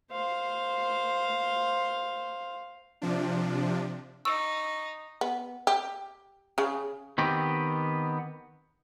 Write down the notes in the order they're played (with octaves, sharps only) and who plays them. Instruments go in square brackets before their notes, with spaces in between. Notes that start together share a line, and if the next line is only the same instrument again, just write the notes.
[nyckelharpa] C5 F5
[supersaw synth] C3 F3 D4
[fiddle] D#4 [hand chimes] C#6 [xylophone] E6
[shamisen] B3
G4
C#3 G#4
[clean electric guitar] D#3 B3 C4 G4